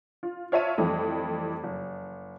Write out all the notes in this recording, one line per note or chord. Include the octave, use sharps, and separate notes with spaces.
F4
F4 C#5 E5 A5 D#7
F2 E3 G3 A3
F#1